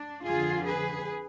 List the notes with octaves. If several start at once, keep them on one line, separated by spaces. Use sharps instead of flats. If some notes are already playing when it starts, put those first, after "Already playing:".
Already playing: D4
F2 D3 F3 F4 G#4
G#4 B4